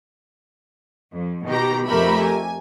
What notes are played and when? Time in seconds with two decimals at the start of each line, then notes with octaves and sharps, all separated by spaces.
1.15 F2
1.49 B2 D#3 G4 A#5
1.86 F2 A3 G4 A#4 E5 B5
2.23 G#5